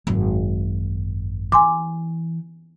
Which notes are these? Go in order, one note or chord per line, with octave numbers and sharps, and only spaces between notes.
G#1 F#2
E3 G#5 C6 D6